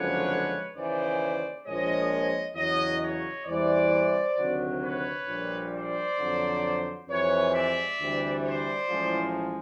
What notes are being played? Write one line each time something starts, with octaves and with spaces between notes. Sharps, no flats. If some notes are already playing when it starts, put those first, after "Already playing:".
Already playing: F#1 F2 D3 F3 G#3 B4 C#5
D#2 C#3 E3 C5 D5
A#1 A#2 F3 G#3 C#5 D#5
E2 C#3 F#3 C#5 D#5
C#5 D#5
E2 C3 E3 G3 C5 D5
D2 C3 D#3 F#3
B4 C#5
A#1 A#2 G3
C5 D5
F2 D3 F#3
F2 C3 E3 G#3 B4 C#5
D5 E5
D2 C3 E3 G3
C5 D5
A1 A2 F3 G#3